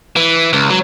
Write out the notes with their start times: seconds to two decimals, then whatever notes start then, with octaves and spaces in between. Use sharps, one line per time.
0.16 E3
0.53 C#2
0.70 F#3